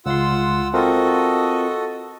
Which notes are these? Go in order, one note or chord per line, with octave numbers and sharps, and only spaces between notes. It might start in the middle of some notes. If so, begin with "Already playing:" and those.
C#2 F4 F#5 C6 E6
C4 F4 F#4 A4 A#4 D#5